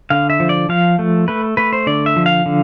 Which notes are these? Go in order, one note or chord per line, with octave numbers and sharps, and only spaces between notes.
D3 F5
E5
F3
D5
F3 F5
A3
A3 B4
A3 B4
C5
D3 D5
E5
F3
F5
D3